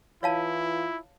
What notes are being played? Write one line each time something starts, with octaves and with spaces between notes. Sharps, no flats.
E3 E4 F4 C#5 F5 A5